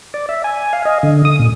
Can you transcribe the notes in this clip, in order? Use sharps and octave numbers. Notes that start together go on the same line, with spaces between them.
D5
E5
G#5
F5
D#5
D3
D#6
A#2